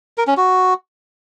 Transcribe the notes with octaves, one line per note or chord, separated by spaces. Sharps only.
A#4
C#4
F#4